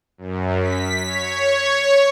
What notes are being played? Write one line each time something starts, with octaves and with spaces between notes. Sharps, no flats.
F#2
B6
C#5